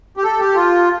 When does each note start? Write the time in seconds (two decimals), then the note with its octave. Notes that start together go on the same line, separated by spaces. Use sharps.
0.17 G4
0.24 A4
0.39 G4
0.55 F4